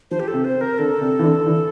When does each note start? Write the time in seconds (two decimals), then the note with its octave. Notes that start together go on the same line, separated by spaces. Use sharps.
0.11 F3 C5
0.20 G4
0.28 A4
0.34 C3
0.44 C5
0.55 C3
0.61 A#4
0.78 D3 A4
1.01 C3
1.19 E3
1.24 D3
1.46 E3